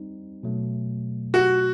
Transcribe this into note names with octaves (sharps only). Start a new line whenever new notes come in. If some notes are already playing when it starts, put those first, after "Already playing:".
Already playing: G3 C4 D#4
B2 F#3 A3
F#4